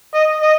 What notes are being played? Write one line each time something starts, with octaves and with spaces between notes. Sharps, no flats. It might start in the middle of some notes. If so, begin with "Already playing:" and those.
D#5
D#5